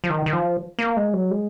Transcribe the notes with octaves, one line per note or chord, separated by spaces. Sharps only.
F3
D#3
D#3
F3
A#3
G#3
F#3
G#3